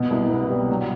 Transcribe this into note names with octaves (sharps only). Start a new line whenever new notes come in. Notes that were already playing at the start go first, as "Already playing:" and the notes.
Already playing: B2
C2
B3
G3
F#3